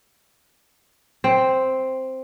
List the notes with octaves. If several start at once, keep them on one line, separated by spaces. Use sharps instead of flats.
C4